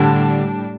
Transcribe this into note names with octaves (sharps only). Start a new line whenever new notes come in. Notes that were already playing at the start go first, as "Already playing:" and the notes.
Already playing: A2 D3 G3 D4